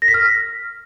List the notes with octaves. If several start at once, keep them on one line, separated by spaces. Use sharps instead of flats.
A#6
B6
F6